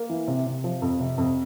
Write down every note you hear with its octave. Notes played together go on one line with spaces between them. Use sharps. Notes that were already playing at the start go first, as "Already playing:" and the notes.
Already playing: A#3
E3
C3
C3
F3
F2
C3
F2